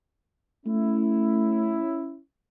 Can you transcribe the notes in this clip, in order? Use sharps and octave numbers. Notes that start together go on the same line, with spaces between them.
A3 C#4 E4